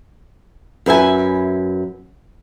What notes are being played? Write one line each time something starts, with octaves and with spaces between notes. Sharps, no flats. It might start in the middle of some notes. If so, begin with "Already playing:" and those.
F#2 B4 E5 G#5